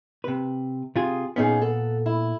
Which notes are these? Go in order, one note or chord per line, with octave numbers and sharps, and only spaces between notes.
C3 B4
C3 F4 G#4
A#2 B3 C#4 D#4 G#4
A4 F#5
E4